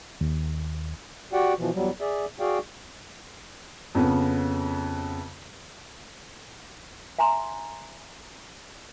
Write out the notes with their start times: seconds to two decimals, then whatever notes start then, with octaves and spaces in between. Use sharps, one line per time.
0.21 D#2
1.33 F#4 G4 D5 F#5 G5
1.58 B2 E3 F3
1.74 E2 F#3 G3
2.00 G#4 D5 E5
2.40 F#4 G#4 D5 F5 G5
3.95 F2 C#3 B3
7.18 E5 G#5 A#5 C6